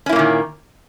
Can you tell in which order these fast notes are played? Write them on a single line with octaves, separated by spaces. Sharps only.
C#4 E4 A#3 A#2 D#3